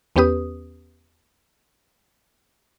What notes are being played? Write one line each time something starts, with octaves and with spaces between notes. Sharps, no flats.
E2 B3 C#4 G4 B4 D#6